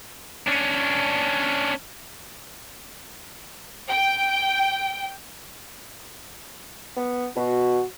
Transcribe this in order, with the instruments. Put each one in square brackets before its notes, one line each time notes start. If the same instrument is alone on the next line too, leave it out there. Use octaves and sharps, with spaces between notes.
[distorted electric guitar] C#4 D4
[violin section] G5
[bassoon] B3
[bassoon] B2 [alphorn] F#4